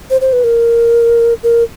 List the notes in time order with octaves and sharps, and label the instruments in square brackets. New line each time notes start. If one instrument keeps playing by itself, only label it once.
[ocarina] C5
C5
B4
A#4
A#4